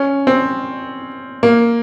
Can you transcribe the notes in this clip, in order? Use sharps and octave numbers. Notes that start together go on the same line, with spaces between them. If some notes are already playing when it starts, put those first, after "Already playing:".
Already playing: C#4
C4
A#3